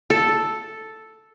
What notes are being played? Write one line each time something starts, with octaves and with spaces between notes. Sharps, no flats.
A4